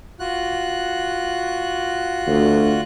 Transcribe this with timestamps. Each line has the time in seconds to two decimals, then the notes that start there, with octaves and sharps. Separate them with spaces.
0.20 F4 F#4 F#6
2.27 D2